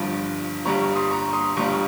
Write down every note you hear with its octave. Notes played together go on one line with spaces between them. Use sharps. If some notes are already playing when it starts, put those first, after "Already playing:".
Already playing: G1 G2 F3 C#6
G1 G2 G3 A#5 C#6
C6 D#6
A#5 C#6
C6 D#6
G1 G2 G3 A#5 C#6